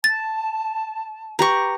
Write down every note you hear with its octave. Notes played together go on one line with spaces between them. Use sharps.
A5 A6
G4 B4 A#5 C#6